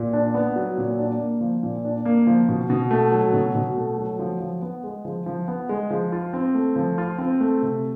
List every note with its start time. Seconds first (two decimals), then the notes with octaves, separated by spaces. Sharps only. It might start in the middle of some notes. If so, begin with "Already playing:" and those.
Already playing: A#2
0.13 D4
0.34 B3
0.56 F#3
0.77 A#2
0.99 D4
1.19 A#3
1.41 F3
1.63 A#2
1.85 D4
2.05 A#3
2.27 F3
2.48 B2
2.70 B2
2.91 A3
3.12 F#3
3.33 B2
3.55 B2
3.77 A3
3.98 F#3
4.19 F3
4.40 F3
4.62 B3
4.84 G#3
5.05 F3
5.26 F3
5.48 B3
5.69 G#3
5.90 F3
6.12 F4
6.33 C4
6.55 A3
6.76 F3
6.98 F4
7.18 C4
7.40 A3
7.62 C3